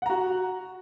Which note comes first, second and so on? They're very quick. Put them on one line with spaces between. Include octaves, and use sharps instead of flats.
F#5 A#5 F#4